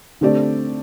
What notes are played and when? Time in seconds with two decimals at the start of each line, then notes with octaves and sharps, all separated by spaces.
0.21 D3 A3 C4 G4 D5